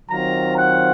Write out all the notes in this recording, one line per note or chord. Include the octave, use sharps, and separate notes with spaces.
D#3 F#3 C4 F4 A#5
F#5